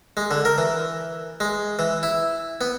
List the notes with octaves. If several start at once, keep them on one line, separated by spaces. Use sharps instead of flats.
G#3
D3
A#4
E3
G#3
E3
E4
B3